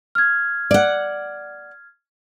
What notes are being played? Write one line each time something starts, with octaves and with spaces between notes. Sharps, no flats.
F6 G#6
D5 F#5